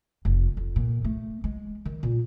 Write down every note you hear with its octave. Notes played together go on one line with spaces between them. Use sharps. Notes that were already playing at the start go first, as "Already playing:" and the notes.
F1
F2
A#2
A3
G#3
D#3
A#2